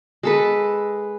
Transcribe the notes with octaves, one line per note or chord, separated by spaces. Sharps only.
G#3 A4 B4